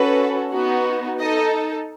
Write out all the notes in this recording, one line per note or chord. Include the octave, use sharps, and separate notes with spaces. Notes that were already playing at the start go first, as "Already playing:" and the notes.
Already playing: C#4 F#4 A4 B4
B3 D#4 F#4
D#4 A4 D#5